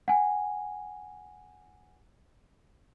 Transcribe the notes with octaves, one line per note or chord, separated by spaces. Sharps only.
F#5 G#5